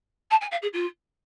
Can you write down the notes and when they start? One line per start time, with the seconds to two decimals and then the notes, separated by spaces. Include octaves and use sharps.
0.30 A5
0.41 G#5
0.51 F5
0.62 G#4
0.73 F4